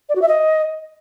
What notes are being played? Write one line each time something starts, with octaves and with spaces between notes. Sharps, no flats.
D5
F#4
E5
D#5